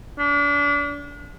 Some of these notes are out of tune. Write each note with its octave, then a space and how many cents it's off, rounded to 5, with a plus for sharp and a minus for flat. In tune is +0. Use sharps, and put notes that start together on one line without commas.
D4 -35